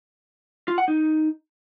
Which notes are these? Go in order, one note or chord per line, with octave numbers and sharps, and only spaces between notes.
F4
F#5
D#4